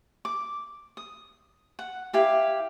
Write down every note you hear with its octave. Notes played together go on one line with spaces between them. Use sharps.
D6
D#6
F#5
E4 G4 F5